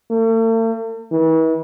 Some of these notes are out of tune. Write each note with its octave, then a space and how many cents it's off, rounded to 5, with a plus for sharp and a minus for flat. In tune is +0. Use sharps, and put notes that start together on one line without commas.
A3 +45
E3 -40